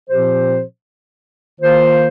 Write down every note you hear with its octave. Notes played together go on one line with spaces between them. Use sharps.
A#2 F3 C4 G4 C5
D#3 A#3 F4 C5